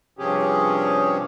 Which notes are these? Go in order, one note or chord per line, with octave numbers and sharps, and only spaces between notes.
G2 C3 F3 C#4 G4 G#4